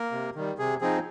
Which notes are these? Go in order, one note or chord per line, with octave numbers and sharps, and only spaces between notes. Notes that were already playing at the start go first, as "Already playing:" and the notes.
Already playing: A#3 A#4
C3
D#3 G3
C3 G#4
F3 C4 D#4 G#4